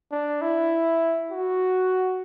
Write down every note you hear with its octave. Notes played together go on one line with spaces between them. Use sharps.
D4
E4
F#4